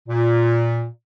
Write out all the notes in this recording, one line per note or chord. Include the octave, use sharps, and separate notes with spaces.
A#2